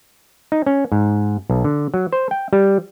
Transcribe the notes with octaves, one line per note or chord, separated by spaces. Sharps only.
D#4
C#4
G#2
B1
D3
F#3
C5
G5
G3